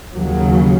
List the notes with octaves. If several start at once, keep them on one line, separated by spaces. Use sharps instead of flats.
D#2 C#3 F#3